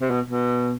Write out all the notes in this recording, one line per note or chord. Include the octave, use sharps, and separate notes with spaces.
C3
B2
B2